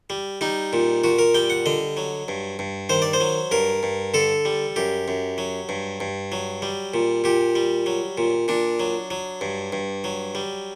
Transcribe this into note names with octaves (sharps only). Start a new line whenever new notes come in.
G3
G3 D#4
A#2
A#2 F#4
A#4
G3 G5
F#5
D3 D#5
F#3
G2
G2
D#3 C5
D5
C5
F#3
G2 A#4
G2
D3 A4
G3
F#2 G4
F#2
F#3
G2
G2
F#3
G3
A#2
A#2 G4
G3
F#3
A#2
A#2 D4
F#3
F#3
G2
G2
F#3
G3